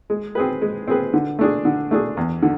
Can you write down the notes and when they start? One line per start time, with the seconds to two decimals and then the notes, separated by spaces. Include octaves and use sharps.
0.10 G#3
0.35 C4 G#4 B4
0.62 G#3
0.88 C4 G#4 B4
1.14 D3
1.39 A3 D4 G#4
1.65 D3
1.91 A3 D4 G#4
2.17 E2
2.43 D3